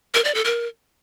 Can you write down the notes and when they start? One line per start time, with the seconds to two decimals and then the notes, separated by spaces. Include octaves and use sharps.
0.14 A#4
0.24 D5
0.35 A4
0.45 A#4